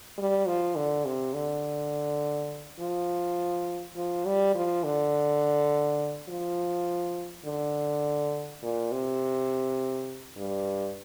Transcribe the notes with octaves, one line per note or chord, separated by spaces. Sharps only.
G3
F3
D3
C3
D3
F3
F3
G3
F3
D3
F3
D3
A#2
C3
G2